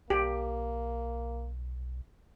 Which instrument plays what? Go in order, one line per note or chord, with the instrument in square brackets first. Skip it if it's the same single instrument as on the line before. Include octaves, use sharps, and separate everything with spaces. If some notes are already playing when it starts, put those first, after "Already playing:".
[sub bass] B1 [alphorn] A#3 [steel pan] G4